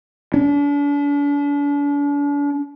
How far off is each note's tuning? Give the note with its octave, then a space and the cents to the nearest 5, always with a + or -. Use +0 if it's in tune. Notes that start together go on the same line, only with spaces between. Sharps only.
D4 -40